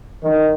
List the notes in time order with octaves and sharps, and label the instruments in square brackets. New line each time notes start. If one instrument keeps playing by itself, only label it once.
[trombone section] D#3